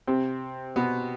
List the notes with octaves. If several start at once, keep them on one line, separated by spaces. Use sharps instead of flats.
C3 C4
B2 B3